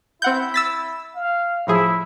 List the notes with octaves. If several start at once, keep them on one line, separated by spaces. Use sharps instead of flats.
C4 E4 F#5 G6
E6 A6 B6
F5
A2 F3 E4 G#4